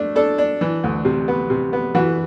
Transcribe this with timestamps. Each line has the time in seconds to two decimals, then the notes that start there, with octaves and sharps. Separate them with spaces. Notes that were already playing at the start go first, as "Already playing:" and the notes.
Already playing: A3 D4
0.16 D4 A4
0.38 D4
0.61 E3
0.84 D2
1.05 C3
1.28 B3
1.50 C3
1.73 B3
1.95 E3 F#4